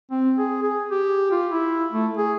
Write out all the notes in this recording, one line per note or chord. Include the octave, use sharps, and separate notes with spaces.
C4
G#4
G#4
G4
F4
E4
A3
G#4